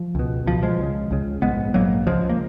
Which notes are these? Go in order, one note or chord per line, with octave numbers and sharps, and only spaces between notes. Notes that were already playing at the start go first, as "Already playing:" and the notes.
Already playing: F3
C#2 B2
C#2 B2 F3
F3 G#3
C#2 C#3
C#2 C#3
A#1 G#2 G#3 B3
A#1 G#2 F#3 A#3
C#2 C#3 F3 G#3
A#3